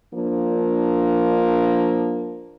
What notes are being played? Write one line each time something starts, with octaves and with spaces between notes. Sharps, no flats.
F3 A#3 D4